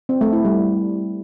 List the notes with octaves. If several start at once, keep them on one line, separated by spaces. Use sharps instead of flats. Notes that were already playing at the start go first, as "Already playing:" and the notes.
C4
A3
E4
G3